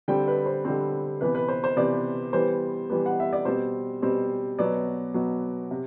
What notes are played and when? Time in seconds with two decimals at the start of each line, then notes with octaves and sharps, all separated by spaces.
0.08 D3 G3 C4 G5
0.28 B4
0.46 C5
0.65 D3 G3 C4
1.21 C3 E3 B3 B4
1.35 B4
1.48 C5
1.64 C5
1.77 C3 E3 B3 D5
2.33 E3 G3 B3 C5
2.90 E3 G3 B3
3.06 F#5
3.20 E5
3.33 D5
3.45 B2 G3 C4 C5
4.02 B2 G3 C4
4.59 B2 F#3 B3 D5
5.14 B2 F#3 B3
5.71 C3